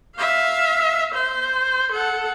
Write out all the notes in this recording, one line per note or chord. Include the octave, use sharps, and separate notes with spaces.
E5 F5
C5
A4 F#5